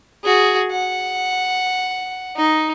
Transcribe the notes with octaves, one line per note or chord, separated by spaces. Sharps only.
F#4 G#4
F#5
D#4